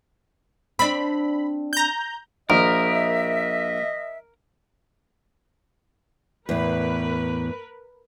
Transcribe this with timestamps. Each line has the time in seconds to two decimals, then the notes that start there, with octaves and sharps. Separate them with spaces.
0.79 C4 D4 B5
1.73 A#5 G6
2.50 A#1 A#4 D#5 E5
6.49 E2 A2 A#4 B4